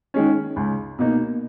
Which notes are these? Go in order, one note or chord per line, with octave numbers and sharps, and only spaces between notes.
D#3 G#3 C#4
C#2
B2 A#3 D#4